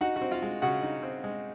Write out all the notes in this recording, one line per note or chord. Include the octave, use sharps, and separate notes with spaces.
D#4 F#4 F#5
F#4 F#5
C4
F4 F5
G#3
C#3 F#4 F#5
D#4
C4
G#3